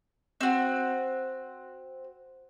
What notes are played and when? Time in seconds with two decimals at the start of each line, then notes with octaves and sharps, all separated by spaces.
0.41 C4 F#4